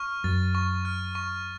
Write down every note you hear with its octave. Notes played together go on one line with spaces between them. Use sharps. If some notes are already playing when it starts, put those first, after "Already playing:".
Already playing: C#6 F6
F#2 A6
C#6
F6
C#6